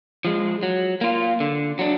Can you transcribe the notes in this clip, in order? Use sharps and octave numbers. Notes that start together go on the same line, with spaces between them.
F3 G#3
F#3
A#3 F4
D3
F#3 D4